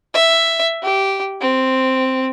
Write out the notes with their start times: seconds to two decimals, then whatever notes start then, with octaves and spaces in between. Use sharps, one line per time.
0.15 E5
0.83 G4
1.41 C4